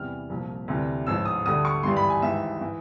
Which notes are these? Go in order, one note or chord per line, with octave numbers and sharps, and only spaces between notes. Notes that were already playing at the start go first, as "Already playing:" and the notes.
Already playing: E2 C3 E3 G3 F6
C2 A#2 F3
D2 C3 E3 G3
A1 G#2 F3 E6
D#6
D2 D3 G3 D#6
C#6
G#1 G2 E3 G3 C6
B5
G#5
G#1 G#2 E3 G3 E5
E3